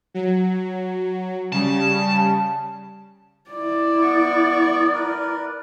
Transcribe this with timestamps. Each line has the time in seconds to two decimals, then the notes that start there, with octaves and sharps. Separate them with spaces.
0.14 F#3
1.52 C#3 G3 A5
3.50 E4 D5
4.02 B3 C#6
4.95 A#4 B4